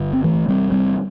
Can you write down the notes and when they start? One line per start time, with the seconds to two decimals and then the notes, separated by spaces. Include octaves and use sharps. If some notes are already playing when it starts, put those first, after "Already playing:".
Already playing: G1 D3
0.13 C4
0.24 E3 A3
0.48 G3 C4
0.72 G3 C4